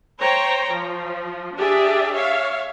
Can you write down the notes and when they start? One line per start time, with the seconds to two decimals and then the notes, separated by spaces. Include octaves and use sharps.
0.20 C5 C#5 G5 A#5
0.71 F3
1.56 D4 G4 G#4 D5 E5
2.13 C#5 E5 F5